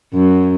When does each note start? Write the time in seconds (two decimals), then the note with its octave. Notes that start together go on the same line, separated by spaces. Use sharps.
0.14 F#2